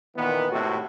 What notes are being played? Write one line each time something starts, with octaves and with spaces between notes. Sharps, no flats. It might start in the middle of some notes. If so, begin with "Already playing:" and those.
A#2 D#3 E3 B3
G#1 A2 C3 F#4 A4